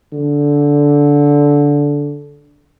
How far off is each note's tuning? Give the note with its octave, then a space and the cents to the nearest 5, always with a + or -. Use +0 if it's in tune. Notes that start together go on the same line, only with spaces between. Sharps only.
D3 -15